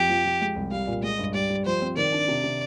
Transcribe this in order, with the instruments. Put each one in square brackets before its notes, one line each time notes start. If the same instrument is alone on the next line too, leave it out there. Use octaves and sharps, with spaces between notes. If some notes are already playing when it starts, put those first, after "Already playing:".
Already playing: [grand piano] F2 [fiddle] G4
[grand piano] F3
F3
G#3
C2
[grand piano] G3 [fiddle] F5
[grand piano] A#2
[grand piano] G#3 [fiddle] D#5
[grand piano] G2
[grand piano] G3 [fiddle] D5
[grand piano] G3
[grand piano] F3 [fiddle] C5
[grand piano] C4
[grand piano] D#3 [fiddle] D5
[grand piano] D4
C3
C3